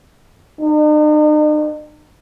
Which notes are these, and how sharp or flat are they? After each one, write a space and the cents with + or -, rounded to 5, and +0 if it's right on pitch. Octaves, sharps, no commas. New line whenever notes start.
D#4 -45